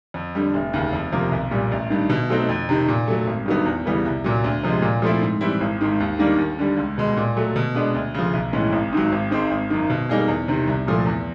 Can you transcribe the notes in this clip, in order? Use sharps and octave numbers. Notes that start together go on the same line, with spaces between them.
F2
D3 G3
F1
D#2 C#3
F2
C3 F3 A#3
B1
A#2 G3
A1
G2 D#3
B2
F#3 A3 C4 D#4
F2
C3 D#3
A#2
F#3 A3
G#1
G2 D#3 F#3 B3
E2
C#3 E3 G3 B3
C2
A#2 F#3
D2
C3 F3 G#3
A#2
F3 A3 C4 E4
G#2
E3 G3 C4 E4
G#1
G#2 D#3
D#2
D#3 G3 A#3 D4
D#2
D3 G3
C#2
B2 G#3
A#2
F#3 A3
B2
G#3 B3 D4
D2
C#3 F3
B1
A2 E3 G#3 C#4
G#1
G#2 D#3 F#3
G#1
G#2 D#3 G#3 C4
G#1
F#2 D#3
B2
G3 A#3 D#4 G#4
E2
C3 D#3
C2
A#2 F3 A3
E2